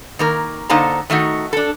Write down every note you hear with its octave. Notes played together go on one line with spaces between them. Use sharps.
D#3 A#3 A#4
D3 A#3 D#4 C5 A5 A#5
D#3 A3 D#4 F#4
D4 A4